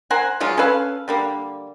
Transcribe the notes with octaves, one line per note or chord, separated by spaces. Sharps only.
A#4 C5 F#5 G#5
F3 F#3 G#3 F4
C#4 A4 B4 F5
D3 G3 A#3